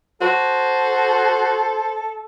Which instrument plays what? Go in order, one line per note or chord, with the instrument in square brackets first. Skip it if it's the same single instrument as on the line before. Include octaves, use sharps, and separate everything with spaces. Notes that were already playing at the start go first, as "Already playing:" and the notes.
[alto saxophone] F#4 [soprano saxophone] A4 [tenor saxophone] C5